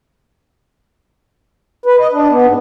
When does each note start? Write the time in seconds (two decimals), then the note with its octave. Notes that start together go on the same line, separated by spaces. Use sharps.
1.86 B4
1.99 D#5
2.12 D4
2.30 B3
2.46 G#2